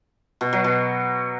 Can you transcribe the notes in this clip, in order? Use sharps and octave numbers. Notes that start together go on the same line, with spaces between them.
B2
F#3
B2